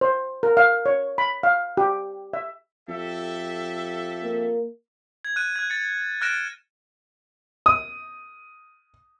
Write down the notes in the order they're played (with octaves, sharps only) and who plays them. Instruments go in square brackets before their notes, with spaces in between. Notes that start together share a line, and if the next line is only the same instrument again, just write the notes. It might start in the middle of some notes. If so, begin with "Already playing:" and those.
[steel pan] C5
A#4
F5
C#5
B5
F5
G4
E5
[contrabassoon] F2 [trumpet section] G4 A4 E5
[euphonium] A#3
[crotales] G#6
F#6 D#7
F#6 G#6
A6 C#7
F6 F#6 A6 A#6 D7 E7
[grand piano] D#6